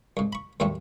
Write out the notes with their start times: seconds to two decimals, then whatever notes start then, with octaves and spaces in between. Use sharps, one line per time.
0.17 C2 G#2
0.33 B5 C#6
0.60 D#2 A2 F#3 G3 A3 C4